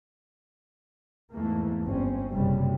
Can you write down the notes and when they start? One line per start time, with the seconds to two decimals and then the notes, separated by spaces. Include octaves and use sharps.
1.34 E2 G#2 E3 A3 A#3
1.84 G1 C4 C#4
2.31 F#1 C3 G3